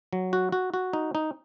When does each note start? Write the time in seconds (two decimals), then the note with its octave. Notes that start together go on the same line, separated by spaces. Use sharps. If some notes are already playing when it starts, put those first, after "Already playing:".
0.13 F#3
0.33 F#4
0.52 F#4
0.74 F#4
0.93 D#4
1.15 D#4